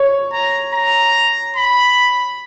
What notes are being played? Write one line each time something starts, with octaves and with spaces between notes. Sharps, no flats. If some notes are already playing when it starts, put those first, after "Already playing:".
Already playing: C#5
A#5
A#5
B5